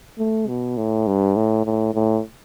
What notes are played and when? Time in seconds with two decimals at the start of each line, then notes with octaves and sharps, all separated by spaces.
0.19 A3
0.48 B2
0.77 A2
1.07 G2
1.36 A2
1.66 A2
1.94 A2